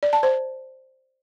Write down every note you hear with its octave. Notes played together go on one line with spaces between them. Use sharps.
D5
A5
C5